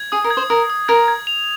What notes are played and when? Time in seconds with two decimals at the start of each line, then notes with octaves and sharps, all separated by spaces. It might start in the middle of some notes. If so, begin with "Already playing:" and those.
Already playing: G#6
0.12 G#4 D#6
0.24 A#4
0.30 G#6
0.37 C5
0.50 A#4 D#6
0.70 D#6
0.88 A#4 G#6
1.08 G#6
1.27 F7